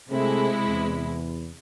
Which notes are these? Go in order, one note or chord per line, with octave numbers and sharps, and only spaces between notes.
C3 G#3 A3 C4 E4 G#4
E2